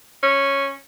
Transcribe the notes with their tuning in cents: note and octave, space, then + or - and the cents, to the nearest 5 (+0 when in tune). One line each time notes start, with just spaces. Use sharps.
C#4 -5